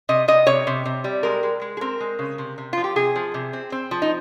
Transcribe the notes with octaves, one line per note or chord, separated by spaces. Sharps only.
C3 D#5
C3 D#5
C3 C#5
C3
C3
G3
G#3 A#4
G#3
G#3
G#4
C4 A#4
G#3
C#3
C3
C3
F3 F4
G4
C3 G#4
F3
C3
C4
C4
F3
D#4